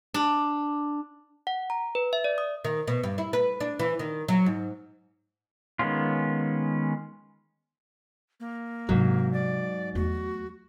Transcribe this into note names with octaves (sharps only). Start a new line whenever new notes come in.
D4
F#5
A#5
B4
E5
D5
D#6
D#3
B2
G2
E4
B4
D4
E3
D#3
F#3
G#2
D#3 G#3 B3 C#4 F4
A#3
G#2 C3 F#3 D4
D5
E2 A3 F#4